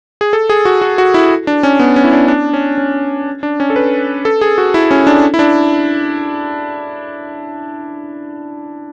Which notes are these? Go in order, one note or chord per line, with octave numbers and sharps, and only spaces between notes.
G#4
A4
G#4
F#4
F#4
F#4
E4
D4
C#4
B3
C#4
E4
D4
D4
C#4
C#4
D4
C#4
A4
B4
A4
G#4
F#4
E4
C#4
D4
E4
D4